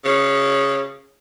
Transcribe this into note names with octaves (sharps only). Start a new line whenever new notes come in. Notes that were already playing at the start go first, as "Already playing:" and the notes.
C#3